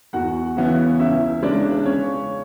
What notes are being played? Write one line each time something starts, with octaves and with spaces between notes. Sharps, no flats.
E2 F#4 F#5
C#3 E3 B3
C#2 E4 E5
C#3 G#3 D4 D5
C#3 C#4 C#5